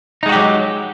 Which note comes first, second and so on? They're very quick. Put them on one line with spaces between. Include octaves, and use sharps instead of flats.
D#4 G#3 F#4 G4 F#3